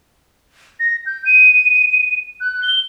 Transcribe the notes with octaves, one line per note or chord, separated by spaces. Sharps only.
A#6
G6
D#7
F#6
G7